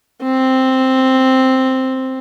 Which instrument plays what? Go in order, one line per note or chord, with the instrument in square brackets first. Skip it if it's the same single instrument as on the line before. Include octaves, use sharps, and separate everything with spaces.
[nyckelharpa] C4